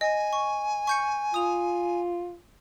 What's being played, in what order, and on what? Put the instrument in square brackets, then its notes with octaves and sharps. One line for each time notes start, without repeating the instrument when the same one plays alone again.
[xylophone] D#5 [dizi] G#5
[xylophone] C#6
C#6 G6 C#7
[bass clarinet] F4 [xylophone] D#6 F7